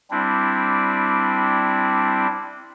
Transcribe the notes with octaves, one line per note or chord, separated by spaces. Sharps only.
G3 C4 D4 E4